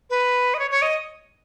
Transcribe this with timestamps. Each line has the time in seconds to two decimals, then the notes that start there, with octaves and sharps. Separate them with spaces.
0.10 B4
0.54 D#5
0.59 C#5
0.71 C#5
0.82 D#5